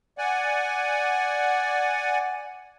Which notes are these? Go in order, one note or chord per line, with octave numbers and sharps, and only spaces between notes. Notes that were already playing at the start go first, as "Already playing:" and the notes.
D5 F#5 G#5